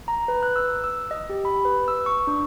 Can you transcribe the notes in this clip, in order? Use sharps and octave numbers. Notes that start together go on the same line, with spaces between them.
A#5
B4
F#6
E6
E6
D#5
G4
B5
B4
E6
C#6
D4